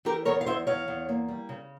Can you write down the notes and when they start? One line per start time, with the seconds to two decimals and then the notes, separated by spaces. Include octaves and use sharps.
0.05 E3 G4 A#4
0.25 E2 A#4 C#5
0.41 F5
0.46 E2 C5 E5
0.67 E2 C#5 F5
0.88 E2
1.09 A#3
1.28 G3
1.49 C#3